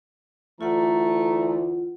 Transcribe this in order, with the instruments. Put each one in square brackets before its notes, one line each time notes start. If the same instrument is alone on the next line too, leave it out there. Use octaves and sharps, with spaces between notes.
[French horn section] D2 E3 [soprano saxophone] A3 [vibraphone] F4 F#5 [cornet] A#5